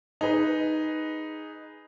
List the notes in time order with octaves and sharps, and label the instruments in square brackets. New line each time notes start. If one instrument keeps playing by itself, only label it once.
[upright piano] D#4 G#4 B4